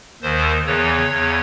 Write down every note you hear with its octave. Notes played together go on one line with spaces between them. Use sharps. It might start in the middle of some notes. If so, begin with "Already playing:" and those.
D#2 D#3 C5
E2 C#3 E3 C#5
E2 C#3